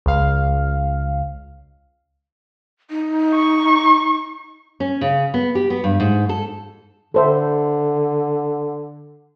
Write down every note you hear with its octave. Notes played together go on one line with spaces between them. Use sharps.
C#2 F5
D#4
C#6
C#4
C#3
B3
G4
B3
G2
G#2
A4
D3 A4 C5 E5